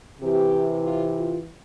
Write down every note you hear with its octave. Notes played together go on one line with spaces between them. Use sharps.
C3 E3 G4
F4
F4